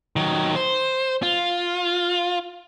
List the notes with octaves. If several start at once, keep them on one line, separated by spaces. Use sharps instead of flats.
D#3 F#3
C5
F4